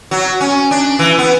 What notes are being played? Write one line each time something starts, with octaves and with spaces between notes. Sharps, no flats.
F#3
C#4
D4
E3
B3